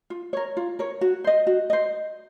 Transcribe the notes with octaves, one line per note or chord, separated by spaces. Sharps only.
F4
A#4 C#5
F4
A#4 C#5
F#4
C5 D#5
F#4
C5 D#5